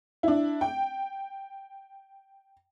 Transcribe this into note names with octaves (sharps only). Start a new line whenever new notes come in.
D4 E4
G5